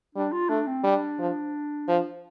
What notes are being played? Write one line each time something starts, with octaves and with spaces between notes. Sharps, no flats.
G3 D4
F4
A3 D4
C4
G3 D4
F3
F3